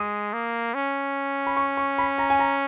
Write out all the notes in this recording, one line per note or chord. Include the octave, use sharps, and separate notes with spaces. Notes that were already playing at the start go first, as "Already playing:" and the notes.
Already playing: G#3 D#6
A#3
C#4
B5
C#6
C#6
B5
A#5
G#5
A#5